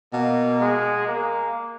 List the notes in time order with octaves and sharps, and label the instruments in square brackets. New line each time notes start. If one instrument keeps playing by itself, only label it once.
[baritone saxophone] B2 [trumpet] A#3
[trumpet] G#3
A#3